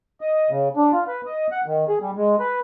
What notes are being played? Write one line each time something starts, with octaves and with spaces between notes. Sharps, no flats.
D#5
C#3
D4
F4
B4
D#5
F#5
D#3
G#4
G3
G#3
B4